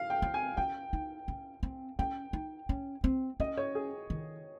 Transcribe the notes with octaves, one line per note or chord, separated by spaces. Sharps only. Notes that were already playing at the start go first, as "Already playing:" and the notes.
Already playing: F5
G5
C4
G#5
C#4 G5
D#4
C#4
C4
C#4 G5
D#4
C#4
C4
C#4 D#5
C#5
G#4
D#3